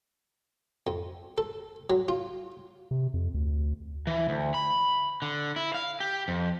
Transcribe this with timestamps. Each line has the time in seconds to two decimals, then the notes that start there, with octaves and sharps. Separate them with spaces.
0.87 F2
1.38 A4
1.90 F#3
2.08 F4
2.91 C3
3.14 F2
3.34 D2
4.07 E3
4.29 D2
4.54 B5
5.22 D3
5.56 E4
5.74 F5
6.00 G4
6.28 F2